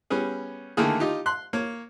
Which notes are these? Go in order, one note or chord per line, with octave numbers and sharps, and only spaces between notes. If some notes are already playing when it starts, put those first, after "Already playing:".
G3 B3 C#4 G#4
D3 D#3 A3 A#3 E4 G#4
D#4 F4 G4
C6 F#6
A#3 C#5